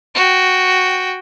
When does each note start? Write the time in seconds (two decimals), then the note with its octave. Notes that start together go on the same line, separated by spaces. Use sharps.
0.15 F#4 G5